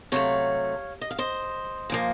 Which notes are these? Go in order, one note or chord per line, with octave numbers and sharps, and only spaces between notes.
C3 F#3 A3 C#5 F5
D#5
F5
C5 D#5
A#2 F3 A#3